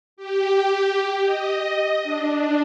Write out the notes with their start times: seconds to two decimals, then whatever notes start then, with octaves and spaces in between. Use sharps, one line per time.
0.17 G4
1.24 D#5
2.03 D4